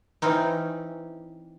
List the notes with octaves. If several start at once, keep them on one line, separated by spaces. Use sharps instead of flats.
E3 C4 C#4 D#4